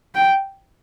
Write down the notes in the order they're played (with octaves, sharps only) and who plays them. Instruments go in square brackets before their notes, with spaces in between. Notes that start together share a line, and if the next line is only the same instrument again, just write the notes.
[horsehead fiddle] G5